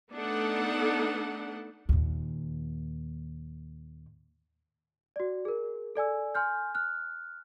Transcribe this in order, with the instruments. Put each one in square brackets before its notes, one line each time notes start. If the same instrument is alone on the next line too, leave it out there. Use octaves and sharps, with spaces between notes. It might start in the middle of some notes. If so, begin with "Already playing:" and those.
[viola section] A3 B3 D4 D#4 A4 F#5
[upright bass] D#2 A#2
[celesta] F#4 D5
G#4 A#4
A4 D5 G#5 E6
G#5 C6 F6 G6
F6 F#6